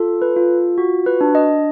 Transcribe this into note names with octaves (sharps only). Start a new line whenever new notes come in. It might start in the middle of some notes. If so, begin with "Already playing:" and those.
Already playing: F4 A4
B4
F4
F#4
B4
D4
D#5